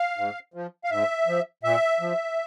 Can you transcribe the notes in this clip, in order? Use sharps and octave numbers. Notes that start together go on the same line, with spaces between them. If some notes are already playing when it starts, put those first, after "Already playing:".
Already playing: F5
G#2
F3
F5
G#2 E5
F3
A#2 E5
F3